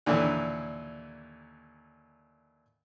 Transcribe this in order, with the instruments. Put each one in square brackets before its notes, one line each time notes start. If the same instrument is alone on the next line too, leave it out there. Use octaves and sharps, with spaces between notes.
[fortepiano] D#2 A#2 D3 E3